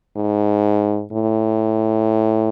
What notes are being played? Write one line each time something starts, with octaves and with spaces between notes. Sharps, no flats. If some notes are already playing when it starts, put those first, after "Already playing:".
G#2
A2